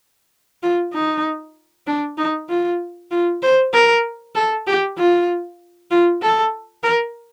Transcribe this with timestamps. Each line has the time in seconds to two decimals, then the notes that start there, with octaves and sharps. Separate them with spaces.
0.63 F4
0.94 D#4
1.87 D4
2.18 D#4
2.49 F4
3.11 F4
3.43 C5
3.73 A#4
4.35 A4
4.67 G4
4.98 F4
5.91 F4
6.22 A4
6.83 A#4